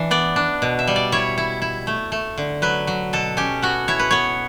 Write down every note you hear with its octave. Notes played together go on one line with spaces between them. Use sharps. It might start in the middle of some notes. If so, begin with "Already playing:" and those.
Already playing: E3 D4
B3 D5
D4
B2
E5
G3
D5
E4 C#5
E4
E4
A3
A3
D3
F#3 B4
F#3
B2 A4
C#4 G4
B3 F#4
E4 C#5
B4
B3 C#5